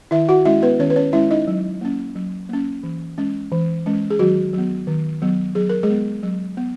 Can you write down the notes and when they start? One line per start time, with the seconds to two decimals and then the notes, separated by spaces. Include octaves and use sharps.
0.11 D#3 E4 E5
0.28 F#4 F#5
0.45 G#3 C#4 E4 E5
0.62 B3 B4
0.80 D#3 C#4 C#5
0.90 B4
0.96 C#4 C#5
1.13 G#3 C#4 E4 E5
1.31 D#4 D#5
1.47 F#3
1.81 A#3 C#4
2.15 F#3
2.49 A#3 C#4
2.83 E3
3.18 G#3 C#4
3.52 E3
3.86 G#3 C#4
4.10 G#4
4.19 D#3 F#3 F#4
4.53 F#3 B3
4.87 D#3
5.22 F#3 B3
5.55 F#3 G#4
5.70 A#4
5.83 G#3 G#4
5.90 B3
6.23 F#3
6.57 B3